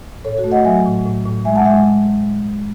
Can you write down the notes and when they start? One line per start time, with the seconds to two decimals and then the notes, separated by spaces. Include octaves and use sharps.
0.25 A2 A4 C#5
0.37 F#4 A4
0.44 A3
0.51 D#5 F#5
0.65 F#3 E5 G#5
0.85 A2
1.05 A2
1.25 A2
1.45 G#3 E5 G#5
1.55 F#5 A5
1.65 G#3 E5 G#5